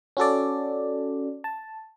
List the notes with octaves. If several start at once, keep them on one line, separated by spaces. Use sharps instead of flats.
C#4 F#4 A4 D5
A5